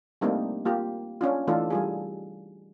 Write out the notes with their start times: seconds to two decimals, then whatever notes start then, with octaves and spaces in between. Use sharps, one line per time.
0.21 G3 A3 A#3 C4 D4 D#4
0.65 A#3 F4 G4
1.21 C#4 D4 F4
1.47 E3 A3 D4 D#4 F4 A4
1.70 G3 F4 G#4